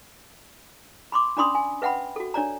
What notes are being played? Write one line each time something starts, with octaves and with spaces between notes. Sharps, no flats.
B5 C6 D6
C#4 D4 D5 B5 C6 D#6
G#5
B4 E5 F#5 G5 B5
F#4 A4
D4 C#5 D5 A#5